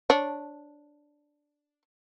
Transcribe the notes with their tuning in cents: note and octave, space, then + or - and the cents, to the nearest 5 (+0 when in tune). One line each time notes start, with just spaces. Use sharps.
D4 +0 C#5 -15